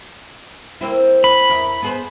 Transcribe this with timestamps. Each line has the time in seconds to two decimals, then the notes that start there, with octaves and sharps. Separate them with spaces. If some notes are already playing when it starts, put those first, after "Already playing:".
0.81 A#3 C4 E4
1.24 B5
1.50 E2 A#4
1.82 B3 G#4 C5